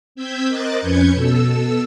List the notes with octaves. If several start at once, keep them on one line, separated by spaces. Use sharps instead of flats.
C4 E6 G6 G#6 B6
A#4 C5 D#5 D6 F#6 A6
F2 C#4 B4 G6 G#6 C#7
B2 A4 E6